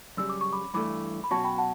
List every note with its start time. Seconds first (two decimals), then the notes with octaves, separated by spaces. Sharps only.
0.17 F#2 C#3 G3 E6
0.29 D6
0.41 C#6
0.53 B5 D6
0.74 G2 E3 A3 B5 D6
1.24 B5
1.31 B2 F#3 C#4 F#4 A5 C#6
1.44 G5 B5
1.58 F#5 A5